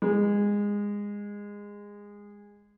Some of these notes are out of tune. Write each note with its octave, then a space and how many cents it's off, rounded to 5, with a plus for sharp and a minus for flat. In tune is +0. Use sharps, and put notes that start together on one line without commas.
G#3 -20